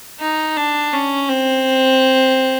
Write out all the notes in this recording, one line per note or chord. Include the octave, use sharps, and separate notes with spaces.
D#4
D4
C#4
C4